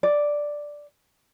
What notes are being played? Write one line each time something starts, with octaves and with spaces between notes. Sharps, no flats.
D5